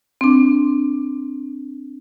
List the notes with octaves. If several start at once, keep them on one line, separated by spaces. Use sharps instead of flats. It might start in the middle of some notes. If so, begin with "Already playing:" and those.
C4 D4